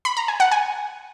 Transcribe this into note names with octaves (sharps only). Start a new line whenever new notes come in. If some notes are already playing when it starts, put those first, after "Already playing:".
B5
A#5
G#5
F#5
G#5